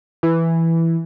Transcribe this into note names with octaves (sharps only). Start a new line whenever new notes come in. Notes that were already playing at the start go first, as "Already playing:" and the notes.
E3